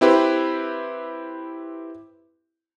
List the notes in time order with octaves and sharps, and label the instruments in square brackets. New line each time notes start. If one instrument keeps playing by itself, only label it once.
[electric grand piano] C4 E4 G4 B4 C5